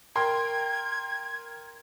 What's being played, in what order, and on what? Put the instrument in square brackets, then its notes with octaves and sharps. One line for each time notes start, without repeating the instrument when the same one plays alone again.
[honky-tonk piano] A#4 G5 C6 [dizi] G#6